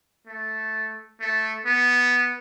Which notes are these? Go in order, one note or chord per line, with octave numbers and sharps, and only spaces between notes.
A3
A3
B3